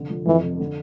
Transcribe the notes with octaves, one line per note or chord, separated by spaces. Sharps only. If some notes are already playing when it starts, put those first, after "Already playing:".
Already playing: F1 D3
F3
F2 E3
F1
D3